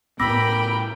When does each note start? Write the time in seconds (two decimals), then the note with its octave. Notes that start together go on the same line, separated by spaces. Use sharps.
0.20 A2 B3 A#4 G5 B5 D6 E6 A#6